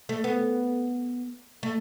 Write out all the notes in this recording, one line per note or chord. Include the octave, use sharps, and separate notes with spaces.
A3
B3
A3